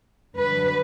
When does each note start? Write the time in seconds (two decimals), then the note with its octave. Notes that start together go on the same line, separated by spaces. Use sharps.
0.36 D3 F#3 B4